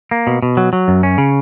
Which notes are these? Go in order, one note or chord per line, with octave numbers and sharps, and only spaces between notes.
A#3
B2
B2
F#3
F#3
F#2
C#4
C#3